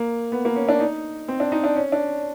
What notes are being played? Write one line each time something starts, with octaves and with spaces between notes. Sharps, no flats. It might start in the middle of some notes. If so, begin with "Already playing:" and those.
Already playing: A#3
B3
A#3
C#4
D4
D#4
C4
D4
D#4
D4
C#4
D4